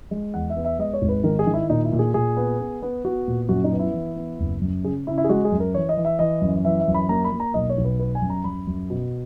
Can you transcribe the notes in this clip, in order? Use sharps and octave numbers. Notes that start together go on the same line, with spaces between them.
G#3
E2 F#5
E5
B3
E5
G#3 D#5
C#5
G#1
B4
D#3 A#4
G#4
D#3
E4
A#2 D#4
E4
A#2
G#4
A#2 G#4
B3
B3
B3
B3 F#4
A#2
F#2 F#4
D#4
B3
E4
E3
B3
F#1
F#2
C#3 G#4
C#3 E4
E4
G#4
G#3 F#4
G#4
F#2
A#4
E3 C#5
D#5
E3
E5
E3 D#5
F#2
E3 E5
E5
F#2
B5
A#3 A#5
B5
A#3
A#5
B1 D#5
C#5
B1
B4
B3 B4
G#5
F#2
A#5
F#2 B5
F#2
B2